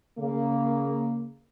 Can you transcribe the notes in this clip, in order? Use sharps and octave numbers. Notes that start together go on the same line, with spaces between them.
C#3 A#3